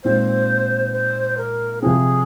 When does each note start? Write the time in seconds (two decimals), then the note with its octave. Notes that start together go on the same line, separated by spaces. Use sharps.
0.04 A#2 G#3 C4 D#4 C5
0.93 C5
1.37 A#4
1.81 C3 F3 C4 G#4